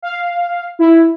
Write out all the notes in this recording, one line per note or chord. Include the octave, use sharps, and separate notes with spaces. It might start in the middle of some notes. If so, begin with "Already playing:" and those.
F5
E4